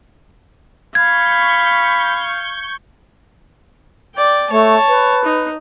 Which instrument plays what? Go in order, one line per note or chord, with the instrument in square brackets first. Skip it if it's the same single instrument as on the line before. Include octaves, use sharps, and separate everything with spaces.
[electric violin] F5 [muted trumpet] B5 [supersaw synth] C#6 G6 [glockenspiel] G#6
[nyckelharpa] D5 G5
[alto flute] A3 [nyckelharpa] C#5 A5
[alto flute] B4
[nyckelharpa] D#4